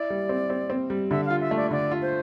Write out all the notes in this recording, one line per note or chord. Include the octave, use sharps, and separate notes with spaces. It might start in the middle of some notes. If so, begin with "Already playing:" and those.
Already playing: E4 D5
G3
C4
C4
C4
G3
D3 E5
F4 F5
E5
A3
D5
D3 D5
F4
C5